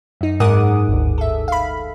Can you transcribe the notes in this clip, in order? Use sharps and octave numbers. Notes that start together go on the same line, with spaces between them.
F#2 D#4
G#2 G#4 A#4 F#5 D6 D#6
G1 D2
A4 E5
F5 B5